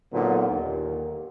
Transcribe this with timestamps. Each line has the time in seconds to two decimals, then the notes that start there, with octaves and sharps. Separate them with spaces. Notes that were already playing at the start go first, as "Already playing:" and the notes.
0.13 A#2 D3 F#3 B3 D#4
0.50 D#2